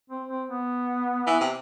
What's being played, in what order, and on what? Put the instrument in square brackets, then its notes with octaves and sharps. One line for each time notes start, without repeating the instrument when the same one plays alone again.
[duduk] C4
C4
B3
[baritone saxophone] E3
C3